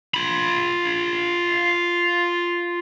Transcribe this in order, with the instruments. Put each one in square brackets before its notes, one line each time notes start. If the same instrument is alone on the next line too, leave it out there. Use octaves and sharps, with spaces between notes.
[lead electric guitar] F4 B5